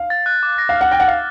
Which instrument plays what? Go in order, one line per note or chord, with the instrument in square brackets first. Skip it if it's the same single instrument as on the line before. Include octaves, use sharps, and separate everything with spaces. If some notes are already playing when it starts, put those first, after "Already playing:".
Already playing: [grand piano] F5
[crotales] A6
F#6
D6
A#6
[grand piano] F5
[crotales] F6
[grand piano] F#5
[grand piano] G5 [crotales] A#6
[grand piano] F#5
[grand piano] F5 [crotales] A#6